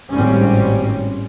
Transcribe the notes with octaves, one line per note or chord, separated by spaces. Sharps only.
G#1 A2 G3 C4 C#4